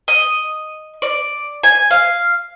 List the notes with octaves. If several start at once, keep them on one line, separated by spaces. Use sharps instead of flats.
D#5
D5
G#5
F5